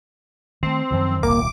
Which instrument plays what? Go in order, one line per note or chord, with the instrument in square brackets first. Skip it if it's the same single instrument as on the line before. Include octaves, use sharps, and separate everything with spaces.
[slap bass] D#3 A3 [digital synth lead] C4
[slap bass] F#2 D#3 F3
[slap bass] D#1 C2 [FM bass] A#3 [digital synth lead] D6